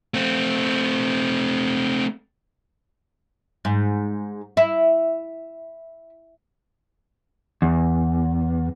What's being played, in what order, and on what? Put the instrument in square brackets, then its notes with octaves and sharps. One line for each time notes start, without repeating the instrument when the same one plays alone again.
[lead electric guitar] A3 C4
[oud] G#2
E4
[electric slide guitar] E2